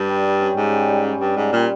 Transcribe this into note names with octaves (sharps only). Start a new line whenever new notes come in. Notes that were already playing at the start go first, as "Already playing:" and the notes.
Already playing: G2 G4
G3
G3
C#4
G#2 G4
G3
G3
C#4
G2 G4
G#2 G3
A#2 G3